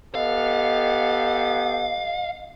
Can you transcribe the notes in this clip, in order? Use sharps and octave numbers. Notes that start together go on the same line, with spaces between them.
B3 G4 A4 D#5 F5